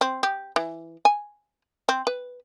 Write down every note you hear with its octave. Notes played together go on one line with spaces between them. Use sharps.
C4
G4
E3
G#5
C4
B4